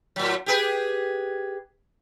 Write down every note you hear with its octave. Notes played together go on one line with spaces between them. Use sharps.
A2 F#3
G4 G#4 B4